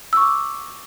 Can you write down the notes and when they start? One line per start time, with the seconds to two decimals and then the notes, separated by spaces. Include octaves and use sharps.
0.13 E6
0.17 C#6
0.21 D6